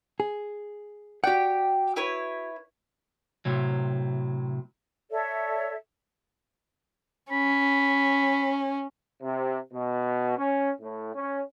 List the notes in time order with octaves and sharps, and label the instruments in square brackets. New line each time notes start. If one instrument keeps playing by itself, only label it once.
[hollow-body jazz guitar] G#4
[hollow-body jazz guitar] F#4 D5 F#5 [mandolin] G4 G5
[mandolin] E4 B4 C#5
[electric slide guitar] A2 C3 F#3
[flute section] A4 C#5 D5 E5
[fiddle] C#4 [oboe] B5
[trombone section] C3
B2
C#4
A2
C#4